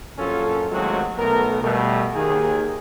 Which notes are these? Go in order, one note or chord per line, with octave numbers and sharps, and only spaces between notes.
A#1 F#2 C#4 F4 A4
D#2 F#3 G#3 A3 C4 F#4
B1 A3 B3 A#4
B2 G3 A3
D#2 D#3 G#4